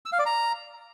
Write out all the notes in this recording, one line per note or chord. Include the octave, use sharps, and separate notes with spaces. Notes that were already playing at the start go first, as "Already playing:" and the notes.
E6
F5
D5
A#5